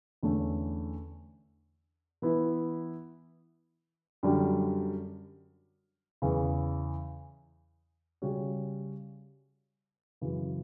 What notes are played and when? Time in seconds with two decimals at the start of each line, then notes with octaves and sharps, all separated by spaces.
0.23 E2 D3 A3 C#4
2.22 E3 B3 E4
4.23 F#2 D3 G3
6.22 E2 C#3 E3
8.22 C#3 G3 C#4 F#4
10.21 F#2 C#3 E3